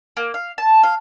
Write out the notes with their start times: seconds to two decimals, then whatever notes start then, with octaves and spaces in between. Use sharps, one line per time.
0.17 A#3
0.34 F5
0.58 A5
0.83 F5